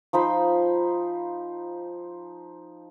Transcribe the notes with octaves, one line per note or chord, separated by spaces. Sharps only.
F3 D#4 C5 B5